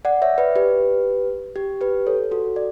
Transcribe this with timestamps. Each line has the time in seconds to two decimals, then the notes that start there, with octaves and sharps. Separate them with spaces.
0.05 D5 F#5
0.22 C#5 E5
0.38 B4 D5
0.56 G4 B4
1.56 G4
1.81 G4 B4
2.07 A4 C#5
2.31 F#4 A4
2.56 D5